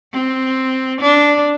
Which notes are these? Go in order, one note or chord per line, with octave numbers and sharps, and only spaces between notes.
C4
D4